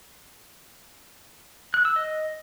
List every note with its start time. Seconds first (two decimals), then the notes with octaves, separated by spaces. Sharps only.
1.74 F#6
1.85 E6
1.96 D#5